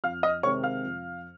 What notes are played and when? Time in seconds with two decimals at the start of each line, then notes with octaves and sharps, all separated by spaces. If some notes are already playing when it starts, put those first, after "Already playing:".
0.04 F2 F5 F6
0.23 D#5 D#6
0.43 C3 D#3 G#3 C4 C#5 C#6
0.63 F5 F6
0.84 F2